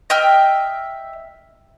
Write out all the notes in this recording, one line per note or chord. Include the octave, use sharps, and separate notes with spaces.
D#5 E5 G5 F6